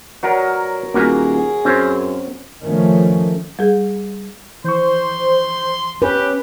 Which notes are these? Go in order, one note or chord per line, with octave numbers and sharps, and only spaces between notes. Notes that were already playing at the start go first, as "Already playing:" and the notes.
F#3 A#4 B4 C#5 D5
D#1 A#3 F#4 G#4 B4
F#2 C4 C#4
D#3 F3 A3 C#4
G3 G#4
E3 C5 C6 C#6
C#4 G4 B4